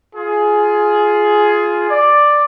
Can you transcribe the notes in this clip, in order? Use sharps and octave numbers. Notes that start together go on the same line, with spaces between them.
F4 G#4
D5